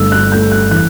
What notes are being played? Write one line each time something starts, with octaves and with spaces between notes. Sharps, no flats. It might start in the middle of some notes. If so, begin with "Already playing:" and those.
Already playing: G1 A3 E6
F#6
A3 G6
F#6
E3 F#6